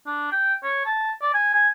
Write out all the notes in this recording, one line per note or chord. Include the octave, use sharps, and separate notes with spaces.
D4
G5
C#5
A5
D5
G#5
G#5